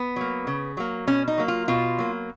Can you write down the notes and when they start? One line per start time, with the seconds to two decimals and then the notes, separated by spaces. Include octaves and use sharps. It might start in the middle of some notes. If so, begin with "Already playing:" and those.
Already playing: B3
0.16 F#3 A#3
0.47 C#3
0.77 F#3 A#3
1.07 B2 C#4
1.28 D#4
1.38 F#3 A#3
1.48 F4
1.68 B2 F4
1.98 F#3 A#3